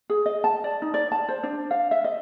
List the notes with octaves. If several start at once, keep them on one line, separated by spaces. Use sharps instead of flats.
G#4
D#5
A5
D5
D#4
D5
A5
C5
D4
F5
E5
D#5